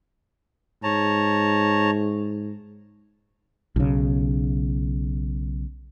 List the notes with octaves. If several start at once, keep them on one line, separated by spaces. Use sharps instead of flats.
G#2 C#5 A5 A#5
B1 C#3